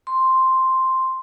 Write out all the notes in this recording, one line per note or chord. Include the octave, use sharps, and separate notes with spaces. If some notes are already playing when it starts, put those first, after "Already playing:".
C6